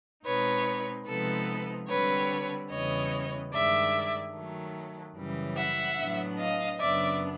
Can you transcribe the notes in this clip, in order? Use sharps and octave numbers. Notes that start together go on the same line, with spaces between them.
B2 G#3 C4 D#4 B4 C#5
C3 F3 G#3 B3 D#4 A4 B4
D3 G3 C4 B4 C#5
E2 C#3 E3 G3 B3 C#5 D#5
G2 D#3 G#3 D5 E5
D#3 F#3 A3
F#2 C#3 E3 G3
E5 F#5
A2 F#3 B3 D4
D#5 F5
F#2 C#3 F#3 B3 D4 D5 E5